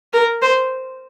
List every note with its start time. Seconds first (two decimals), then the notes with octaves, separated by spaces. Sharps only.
0.13 A#4
0.42 C5